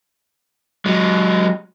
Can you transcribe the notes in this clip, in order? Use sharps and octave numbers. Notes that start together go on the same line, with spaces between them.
F#3 G#3